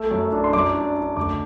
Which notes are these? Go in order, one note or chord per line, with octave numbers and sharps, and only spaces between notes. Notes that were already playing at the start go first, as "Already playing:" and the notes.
Already playing: A3 E6
F#2
D4
C6
F#2 D6
D4
D4
D2 D6